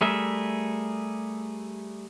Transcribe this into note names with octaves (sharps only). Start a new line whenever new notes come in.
G3 A3 G#4 A#4 E5